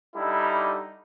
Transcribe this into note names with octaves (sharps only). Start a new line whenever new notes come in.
D3 G3 D#4 E4